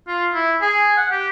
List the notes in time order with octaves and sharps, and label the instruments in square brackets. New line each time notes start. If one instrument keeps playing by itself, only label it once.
[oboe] F4
E4
G#4
F#5
G4